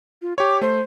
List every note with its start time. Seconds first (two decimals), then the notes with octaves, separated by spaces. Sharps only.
0.22 F4
0.38 G4 C#5 D6
0.61 A3 C5